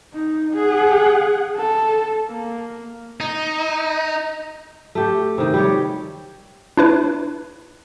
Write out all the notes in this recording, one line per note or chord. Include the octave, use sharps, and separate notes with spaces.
D#4
G#4 F#5
A4
A#3
D#4
A3 G4
C3 D#3
G3 G4 C#5
D4 E4 B4